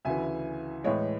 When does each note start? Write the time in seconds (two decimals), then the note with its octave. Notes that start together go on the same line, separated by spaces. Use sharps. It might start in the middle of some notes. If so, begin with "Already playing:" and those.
0.05 D2 C#3 E3 E5 G#5
0.84 A2 E3 G#3 C#5